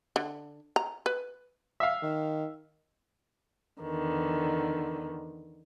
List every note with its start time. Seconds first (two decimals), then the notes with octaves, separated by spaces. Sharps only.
0.16 D3
0.76 A#5
1.06 B4
1.80 E5 F5
2.02 D#3
3.83 E2 D3 D#3 B3